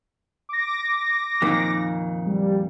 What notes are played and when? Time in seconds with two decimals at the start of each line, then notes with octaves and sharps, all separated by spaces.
0.49 D6 A#6
1.42 F2 A#2 D#3
2.26 G3